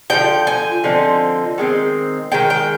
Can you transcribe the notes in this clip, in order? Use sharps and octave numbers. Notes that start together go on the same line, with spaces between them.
D3 F3 C4 D#4 G5
G#5
D3 F3 C4 D#4
D#3 G#3 C4
D#3 G#3 G5
G5